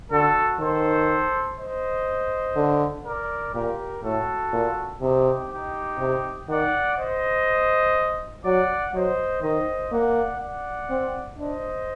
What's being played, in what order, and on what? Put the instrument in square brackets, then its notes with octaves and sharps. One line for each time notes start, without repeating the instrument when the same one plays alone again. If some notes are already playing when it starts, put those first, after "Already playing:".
[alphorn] D3 [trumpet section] F#4 A4
[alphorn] D#3 [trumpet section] A4 C5
[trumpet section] C5 D#5
[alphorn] D3
[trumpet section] A#4 D5
[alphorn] A#2 [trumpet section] G4 A#4
[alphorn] A2 [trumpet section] F#4 A4
[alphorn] A#2
[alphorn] C3 [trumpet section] D#4 G4
[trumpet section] D#4 G4
[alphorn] C3
[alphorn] D#3 [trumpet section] D5 F#5
[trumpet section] C5 D#5
[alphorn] F#3 [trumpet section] D5 F#5
[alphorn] F#3 [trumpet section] C5 D#5
[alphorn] D#3 [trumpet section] C5 D#5
[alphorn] A#3 [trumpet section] D5 F#5
[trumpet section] D5 F#5
[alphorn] C4
[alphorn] D4 [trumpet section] C5 D#5